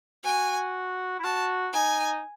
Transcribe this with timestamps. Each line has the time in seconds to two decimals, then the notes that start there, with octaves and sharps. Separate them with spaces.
0.24 F#4 G#5
1.19 E4
1.24 F#4 A5
1.73 D#4 G#5